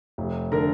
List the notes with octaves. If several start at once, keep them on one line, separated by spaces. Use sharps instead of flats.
F1
D3 A#4 A#5